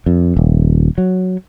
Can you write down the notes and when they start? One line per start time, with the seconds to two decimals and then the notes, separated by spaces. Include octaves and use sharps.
0.06 F2
0.37 D#1
0.98 F#3